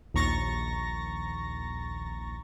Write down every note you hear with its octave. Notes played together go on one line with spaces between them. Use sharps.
A#1 D#2 A#5 C#6 A6 A#6